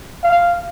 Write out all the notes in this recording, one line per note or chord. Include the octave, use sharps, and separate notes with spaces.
F5